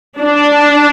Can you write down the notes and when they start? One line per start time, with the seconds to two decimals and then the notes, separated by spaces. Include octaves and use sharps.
0.19 D4